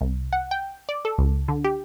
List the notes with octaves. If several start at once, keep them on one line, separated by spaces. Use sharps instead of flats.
C2
F#5
G5
D5
A4
C#2
D3
G4